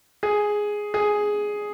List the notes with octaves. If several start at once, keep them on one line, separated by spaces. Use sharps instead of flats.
G#4
G#4